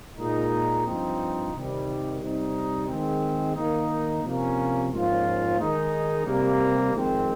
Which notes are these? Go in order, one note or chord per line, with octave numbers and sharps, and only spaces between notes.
A#2 G#3 D#4
G2 F3 C4 D#4
C3 D#3 G3
C3 G3 C4 D#4
D#3 G#3 C4
D#3 A#3 D#4
C3 F3 A#3 C#4
G#2 F3 A#3 C#4 F4
D#3 G#3 D#4
C3 G3 A#3
F2 D#3 G#3 C4